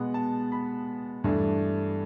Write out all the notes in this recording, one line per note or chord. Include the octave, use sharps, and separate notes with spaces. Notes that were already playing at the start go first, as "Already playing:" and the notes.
Already playing: B2 G#3 B3 F#5
A5
B5
G2 E3 A3 D4